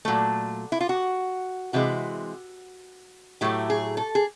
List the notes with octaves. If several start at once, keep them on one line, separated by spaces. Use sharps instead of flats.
A#2 F#3 A3
E4
F4
F#4
C3 E3 G#3 F#4
A2 F#3 A3 G4
G#4
A4
G#4